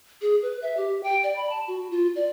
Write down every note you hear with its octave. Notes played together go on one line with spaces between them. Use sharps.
G#4
B4
E5
G4
G5
D5
B5
A5
F#4
F4
D5